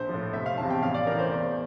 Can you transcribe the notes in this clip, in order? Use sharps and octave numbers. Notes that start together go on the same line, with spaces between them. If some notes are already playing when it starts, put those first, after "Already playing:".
Already playing: A#1 C5
A2 F3
F1 E5
F5
E2 C3 F3 A5
G5
A1 F5
D5
A2 E3 A#4
C5
E2 D5